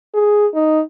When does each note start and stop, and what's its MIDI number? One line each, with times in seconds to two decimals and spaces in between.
0.14 0.47 68
0.55 0.81 63